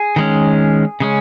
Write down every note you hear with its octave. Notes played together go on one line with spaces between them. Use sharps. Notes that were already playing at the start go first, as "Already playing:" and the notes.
Already playing: G#4
D#3 G#3 C#4
C#3 G#3 C#4